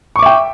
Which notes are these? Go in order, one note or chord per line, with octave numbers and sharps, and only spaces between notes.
E5 G5 C#6 D6